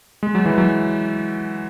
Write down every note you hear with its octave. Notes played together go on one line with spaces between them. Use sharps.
G#3
F#3
E3
F#3